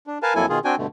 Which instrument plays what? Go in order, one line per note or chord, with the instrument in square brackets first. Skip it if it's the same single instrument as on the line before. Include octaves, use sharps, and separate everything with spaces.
[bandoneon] D4
A#4 B4 F5 G#5 A5
F2 F#3 A#3 E4 A4 G#5
B2 D#3 F4 G#4
C4 D4 F#4 G5 G#5
G2 B2 D3 A3